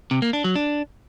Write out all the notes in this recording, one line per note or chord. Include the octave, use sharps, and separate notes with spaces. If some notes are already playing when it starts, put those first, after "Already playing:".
C3
A#3
D4
F#3
D4